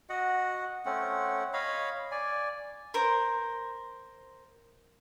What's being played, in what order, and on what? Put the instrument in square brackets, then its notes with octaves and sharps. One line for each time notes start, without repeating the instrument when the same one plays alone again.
[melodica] F#4 D#5 F#5
A3 C4 C#4 F#5
C#5 D#5 F5 B5
D5 G#5
[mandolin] A#4 C5